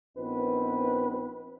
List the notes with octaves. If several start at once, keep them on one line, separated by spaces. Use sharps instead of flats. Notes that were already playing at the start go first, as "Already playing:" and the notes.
A#1 B3 C4 D#4 B4